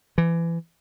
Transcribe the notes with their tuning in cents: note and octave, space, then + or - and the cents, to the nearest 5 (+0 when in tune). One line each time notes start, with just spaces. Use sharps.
E3 +25